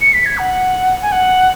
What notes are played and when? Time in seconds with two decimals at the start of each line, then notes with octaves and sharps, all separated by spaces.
0.01 C#7
0.13 B6
0.25 G#6
0.38 F#5
1.02 G#5
1.11 F#5